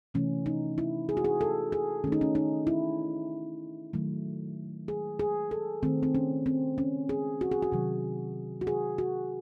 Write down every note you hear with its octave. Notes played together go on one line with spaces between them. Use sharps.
C3 E3 A3 C#4
D#4
E4
G#4
F#4
G#4
A4
G#4
D#3 A3 C#4
D#4
C#4
D#4
E4
D#3 F#3 A3
G#4
G#4
A4
D#3 A3 C4
C4
C#4
C4
C#4
G#4
F#4
G#4
F#4
C3 D#3 F#3
F#4
G#4
F#4